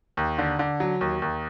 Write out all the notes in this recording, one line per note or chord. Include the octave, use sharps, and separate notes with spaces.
D#2
D3
D3
F#3
D#2
D#2